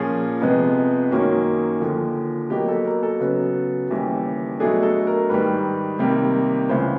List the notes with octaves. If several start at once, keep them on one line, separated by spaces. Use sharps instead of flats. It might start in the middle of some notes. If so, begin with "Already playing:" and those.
Already playing: A#2 F3 A#3 C#4 G#4
F2 C3 F3 G#3 B3
F#2 D#3 F#3 A#3 C#4
D#2 D3 F3
B2 F#3 A#3 G4
A4
A#4
A4
C#3 F#3 B3
D#2 C#3 E3 G3
B2 F#3 A3 D4 G#4
A4
A#4
G#2 D#3 G3 B4
C3 D#3 G3 A#3
C#2 C#3 E3 C5